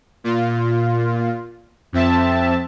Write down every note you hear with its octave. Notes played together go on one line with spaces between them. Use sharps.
A#2 F4
F2 C4 E5 A5